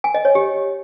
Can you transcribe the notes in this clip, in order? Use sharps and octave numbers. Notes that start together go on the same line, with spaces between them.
G#5
D#5
C#5
G4